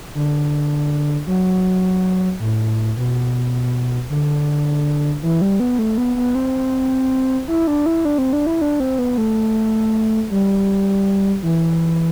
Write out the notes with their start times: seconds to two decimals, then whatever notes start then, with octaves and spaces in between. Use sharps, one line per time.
0.15 D3
1.27 F#3
2.40 A2
2.97 B2
4.10 D3
5.23 E3
5.41 G3
5.60 B3
5.79 A3
5.98 B3
6.16 B3
6.35 C4
7.48 E4
7.67 D4
7.86 E4
8.05 D4
8.18 C4
8.33 D4
8.47 E4
8.62 D4
8.80 C4
8.99 B3
9.18 A3
10.30 G3
11.43 E3